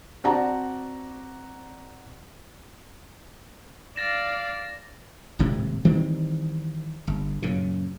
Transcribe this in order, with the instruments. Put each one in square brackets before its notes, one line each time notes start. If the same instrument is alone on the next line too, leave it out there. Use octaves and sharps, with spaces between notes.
[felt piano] C4 F#4 D5 F#5 A5 A#5
[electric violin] D5 F5 [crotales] A6 A#6 E7
[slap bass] D#1 G#1 A2 C3
D#3 E3 G3 C4
G1
F#2 A#2 C#3